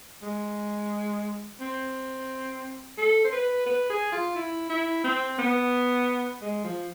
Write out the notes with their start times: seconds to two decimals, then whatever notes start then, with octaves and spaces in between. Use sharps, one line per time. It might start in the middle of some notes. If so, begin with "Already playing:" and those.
0.22 G#3
1.60 C4
2.98 A4
3.24 C5
3.32 B4
3.66 B4
3.90 G#4
4.12 F4
4.35 E4
4.69 E4
5.04 C4
5.39 B3
6.41 G#3
6.64 F3